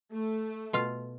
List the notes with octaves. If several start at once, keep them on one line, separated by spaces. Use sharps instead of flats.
A3
B2 F4 F5